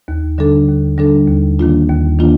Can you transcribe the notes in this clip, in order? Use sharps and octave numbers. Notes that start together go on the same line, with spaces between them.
D#2
D3 G3 D4 A4
D#2
D3 G3 D4 A4
D#2
D#3 A#3 D4 F4
D#2
D#3 A#3 D4 F4